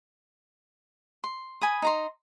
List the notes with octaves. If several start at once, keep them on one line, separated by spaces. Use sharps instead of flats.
C6
G#5 B5 D#6
D#4 A#5 C6